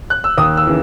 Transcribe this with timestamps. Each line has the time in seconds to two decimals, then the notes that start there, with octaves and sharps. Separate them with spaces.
0.10 F#6
0.24 E6
0.38 D#2 D#6
0.57 E6
0.67 C#3 E3